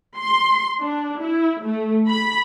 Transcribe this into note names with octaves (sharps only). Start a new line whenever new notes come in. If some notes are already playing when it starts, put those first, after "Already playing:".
C6
D4
E4
A3
B5